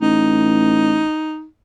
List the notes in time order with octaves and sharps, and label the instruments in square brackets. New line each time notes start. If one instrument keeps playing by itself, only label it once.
[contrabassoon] A1 [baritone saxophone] D#4